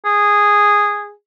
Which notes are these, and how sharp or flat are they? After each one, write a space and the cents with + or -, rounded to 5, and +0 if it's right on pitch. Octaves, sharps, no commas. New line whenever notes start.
G#4 -10